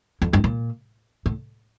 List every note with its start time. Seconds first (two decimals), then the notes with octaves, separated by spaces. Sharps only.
0.22 F2
0.33 G2
0.44 A#2
1.26 A2